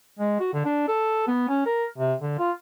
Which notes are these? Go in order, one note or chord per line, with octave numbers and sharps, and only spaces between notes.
G#3
F#4
D3
D4
A4
B3
C#4
A#4
C3
D3
F4